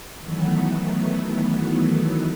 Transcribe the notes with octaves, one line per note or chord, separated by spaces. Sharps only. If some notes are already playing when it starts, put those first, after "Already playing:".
D#3 E3 F#3 A3 B3